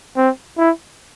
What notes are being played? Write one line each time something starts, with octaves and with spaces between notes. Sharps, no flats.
C4
E4